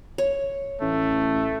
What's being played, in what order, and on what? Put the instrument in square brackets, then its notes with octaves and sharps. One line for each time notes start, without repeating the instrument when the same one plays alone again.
[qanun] C#5
[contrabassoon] A1 [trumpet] A3